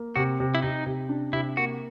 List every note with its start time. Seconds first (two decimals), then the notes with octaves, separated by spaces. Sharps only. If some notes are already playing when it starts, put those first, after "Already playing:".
Already playing: A#3
0.16 C3 F#4
0.40 C3
0.55 E4
0.62 C3 D#4
0.86 C3
1.09 D4
1.33 C3 E4
1.57 A#3 F#4